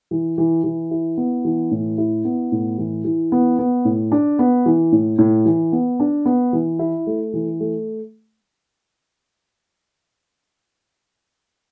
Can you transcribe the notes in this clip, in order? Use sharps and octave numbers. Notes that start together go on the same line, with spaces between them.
E3
E3
E3
E4
B3
E3
A2
E4
B3
A2
E3
E3
B3
B3
A2
D4
B3
E3
A2
A2
E3
B3
D4
B3
E3
E4
A3
E3
A3